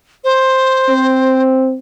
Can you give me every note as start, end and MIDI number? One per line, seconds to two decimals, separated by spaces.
0.24 1.42 72
0.89 1.79 60